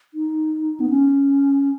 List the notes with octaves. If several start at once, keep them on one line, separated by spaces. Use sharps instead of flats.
D#4
B3
C#4